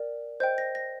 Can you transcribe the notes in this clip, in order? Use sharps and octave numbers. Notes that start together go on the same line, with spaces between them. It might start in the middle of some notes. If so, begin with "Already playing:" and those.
Already playing: A#4 D5 G5
C5 D#5 G5 G6
A#6
A#6